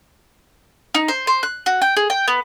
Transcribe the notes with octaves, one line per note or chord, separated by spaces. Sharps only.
D#4
C5
C5
F#6
F#4
G5
G#4
G5
B3